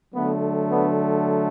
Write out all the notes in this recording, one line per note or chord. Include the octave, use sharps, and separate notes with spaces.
D3 F#3 A3 B3
B3 D4